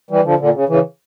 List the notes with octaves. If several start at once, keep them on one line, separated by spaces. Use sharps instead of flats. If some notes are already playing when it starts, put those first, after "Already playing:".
E3 G3
D3 F3
A#2 D3
C#3
C#3 E3